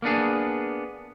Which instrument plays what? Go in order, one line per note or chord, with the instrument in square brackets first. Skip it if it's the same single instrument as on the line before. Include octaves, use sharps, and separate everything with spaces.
[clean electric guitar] A#3 B3 D4 G#4